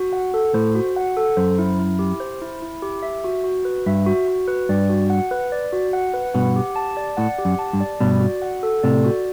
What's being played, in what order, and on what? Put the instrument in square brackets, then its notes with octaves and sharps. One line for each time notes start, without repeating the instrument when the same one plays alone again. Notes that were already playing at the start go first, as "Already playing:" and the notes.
Already playing: [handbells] F#4
F#5
A4
[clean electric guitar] A2 [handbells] C5
[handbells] F#4
F#5
A4
[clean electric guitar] F#2 [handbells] C5
[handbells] E4
E4
G4
C5
E4
E4
G4
E5
F#4
F#4
B4
[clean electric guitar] G2 [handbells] E5
[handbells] F#4
F#4
B4
[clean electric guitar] G2 [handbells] D5
[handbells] F#4
F#5
B4
D5
F#4
F#5
B4
[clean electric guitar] G2 B2 [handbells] F#5
[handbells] G4
A5
D5
[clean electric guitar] A2 [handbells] F#5
[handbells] G4
[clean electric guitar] F#2
[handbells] A5
[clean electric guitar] G2
[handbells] D5
[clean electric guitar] G2 B2 [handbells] D5
[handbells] F#4
F#5
A4
[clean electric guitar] A2 C3 [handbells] D5
[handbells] F#4